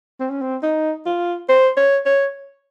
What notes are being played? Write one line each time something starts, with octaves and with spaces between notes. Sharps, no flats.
C4
C#4
C4
D#4
F4
C5
C#5
C#5